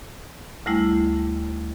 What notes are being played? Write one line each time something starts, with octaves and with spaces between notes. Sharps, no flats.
D2 G3 A3 E4